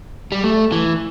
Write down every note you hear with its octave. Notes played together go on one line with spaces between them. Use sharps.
G3
A3
E3